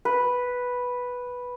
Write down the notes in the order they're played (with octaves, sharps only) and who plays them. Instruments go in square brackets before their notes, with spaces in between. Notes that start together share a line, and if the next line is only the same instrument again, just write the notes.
[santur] B4